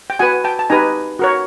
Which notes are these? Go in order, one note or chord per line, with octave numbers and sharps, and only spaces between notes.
G5
F#4 B4 F#5 G#5
G5 A5
A5
D#4 G4 B4 G#5 A#5
F#4 A#4 C#5